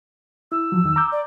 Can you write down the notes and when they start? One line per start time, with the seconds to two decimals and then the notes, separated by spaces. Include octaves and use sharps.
0.52 E4 E6
0.72 F3 F#3
0.84 E2 D#3
0.96 A#5 D6 G6
1.12 D5